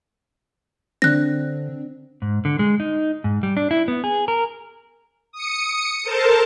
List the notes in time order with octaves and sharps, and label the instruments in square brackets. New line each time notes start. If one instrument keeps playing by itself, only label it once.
[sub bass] D3 [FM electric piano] C4 D4 [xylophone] F#6 A#6
[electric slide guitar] G#2
D3
G#3
D#4
G#2
G3
D4
E4
B3
G#4
A#4
[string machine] D#6 C#7
A4 A#4 C5 A5